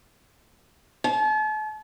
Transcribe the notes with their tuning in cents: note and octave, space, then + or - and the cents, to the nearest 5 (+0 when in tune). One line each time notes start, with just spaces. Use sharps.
A5 -40